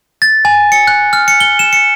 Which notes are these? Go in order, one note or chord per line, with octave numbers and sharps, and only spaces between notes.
A6
G#5
C#7
F#6
F6
C#7
G7
E7
C#7